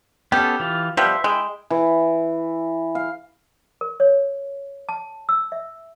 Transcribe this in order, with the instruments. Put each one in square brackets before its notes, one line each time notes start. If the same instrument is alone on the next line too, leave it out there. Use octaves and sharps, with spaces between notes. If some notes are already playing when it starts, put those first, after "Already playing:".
[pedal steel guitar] B3 C#4 A4 [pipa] G4
[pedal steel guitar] E3 F4
[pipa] F3 G3 B3 [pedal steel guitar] C5 E5
[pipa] G#3 [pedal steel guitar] E4 G5
[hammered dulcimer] E3
F5
[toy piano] A#4
C#5
A5
E6
E5